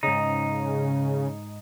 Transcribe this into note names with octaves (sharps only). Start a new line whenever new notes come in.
G#2 C#3 D#4